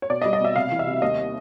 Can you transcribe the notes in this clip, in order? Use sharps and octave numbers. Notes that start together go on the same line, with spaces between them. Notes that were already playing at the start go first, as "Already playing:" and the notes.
C#5
B2 D5
D#5
G3
D#5
B2 E5
C3 F5
E3
E5
C3
D#2 D#5